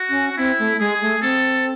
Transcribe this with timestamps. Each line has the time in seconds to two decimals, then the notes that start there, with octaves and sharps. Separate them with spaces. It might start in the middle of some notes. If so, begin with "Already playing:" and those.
Already playing: F#4
0.10 C#4
0.37 C4 E4
0.59 A3
0.79 G#3 G#4
1.01 A3
1.22 C4 A4